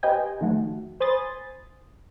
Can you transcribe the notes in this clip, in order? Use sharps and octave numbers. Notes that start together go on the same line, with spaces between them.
G4 B4 C5 D#5 G5 G#5
D#3 F3 A3 F#4
C5 G#5 B5 C6 D#6 A6